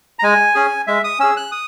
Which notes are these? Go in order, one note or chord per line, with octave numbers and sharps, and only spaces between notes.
A#5
G#3 G#5
C#4 G#4
G#3 E5
D#6
C#4 G#4 E6
F#6
D#6